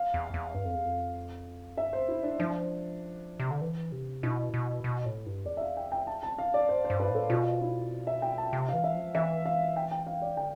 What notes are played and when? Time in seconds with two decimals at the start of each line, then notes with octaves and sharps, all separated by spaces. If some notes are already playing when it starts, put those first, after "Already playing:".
Already playing: F5
0.14 E2
0.34 E2
0.54 G2
0.65 F2
0.75 E2
0.85 F2
1.77 G2 E5
1.93 C5
1.98 F2
2.08 E4
2.23 D4
2.39 F3 D4
3.40 C3
3.51 D3
3.61 E3
3.92 C3
4.23 B2 E4
4.54 B2
4.84 B2
5.06 A2
5.26 G2
5.45 E2 D5
5.57 E5
5.61 F5
5.77 G5
5.92 G5
6.07 A5
6.23 A5
6.38 F5
6.54 D5
6.68 G2 C5
6.84 C5
6.90 G2
7.00 B4
7.10 A2 A4
7.30 B2 F4
7.61 E4
8.07 E5
8.22 G5
8.38 A5
8.53 C3
8.69 F5
8.74 E3
8.84 E5
8.94 F3
9.15 E3 E5
9.45 F5
9.76 G5
9.91 G5
10.07 F5
10.22 D5
10.37 D3 G5